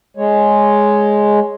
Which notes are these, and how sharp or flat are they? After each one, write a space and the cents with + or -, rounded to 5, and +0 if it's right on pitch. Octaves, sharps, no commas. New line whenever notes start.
G#3 +5 C#5 +0